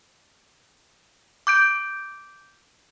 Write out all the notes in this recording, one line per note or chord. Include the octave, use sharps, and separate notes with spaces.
D6 G6 D7